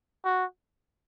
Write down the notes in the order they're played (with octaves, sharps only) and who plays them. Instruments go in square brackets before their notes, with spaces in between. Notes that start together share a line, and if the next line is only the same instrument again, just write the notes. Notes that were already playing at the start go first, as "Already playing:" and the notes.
[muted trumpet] F#4